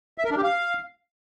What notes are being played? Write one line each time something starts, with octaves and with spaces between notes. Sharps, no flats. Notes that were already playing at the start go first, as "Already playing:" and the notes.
E5
A#4
D4
G4
F5